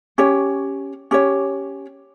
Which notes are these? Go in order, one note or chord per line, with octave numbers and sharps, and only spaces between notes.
C#4 G4 C#5
C#4 G4 C#5